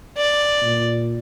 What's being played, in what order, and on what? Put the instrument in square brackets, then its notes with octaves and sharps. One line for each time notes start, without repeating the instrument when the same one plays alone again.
[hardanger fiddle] D5
[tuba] A#2